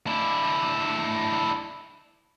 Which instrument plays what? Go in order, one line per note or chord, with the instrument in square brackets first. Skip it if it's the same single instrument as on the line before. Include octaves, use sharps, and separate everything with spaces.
[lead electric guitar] D4 E4